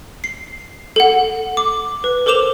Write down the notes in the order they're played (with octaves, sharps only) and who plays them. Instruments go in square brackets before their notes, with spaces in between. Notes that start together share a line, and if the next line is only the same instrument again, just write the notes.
[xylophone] C7
A4 F#5
D6
B4
A4 A#4 C5 D6 E7 F7